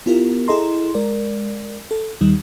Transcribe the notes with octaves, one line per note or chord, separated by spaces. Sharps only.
B3 E4 F4 G4 A#4
E4 G#4 A4 D#5 A#5 C6
G#3 A#4 D5
A4
D#2 D#3 G3